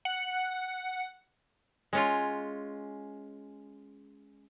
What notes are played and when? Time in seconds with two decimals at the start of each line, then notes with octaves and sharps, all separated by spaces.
0.05 F#5
1.93 G#3 C#4 F4